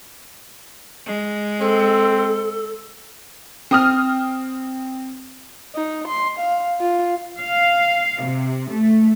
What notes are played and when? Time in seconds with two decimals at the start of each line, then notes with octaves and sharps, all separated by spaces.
1.06 G#3
1.60 C4 A4
3.71 C4 D#6 F6
5.75 D#4
6.08 C6
6.39 F5
6.80 F4
7.41 F5
8.24 C3
8.70 A3